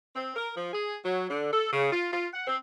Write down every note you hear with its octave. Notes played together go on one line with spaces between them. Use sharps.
C4
A#4
F3
G#4
F#3
D3
A4
C#3
F4
F4
F#5
C4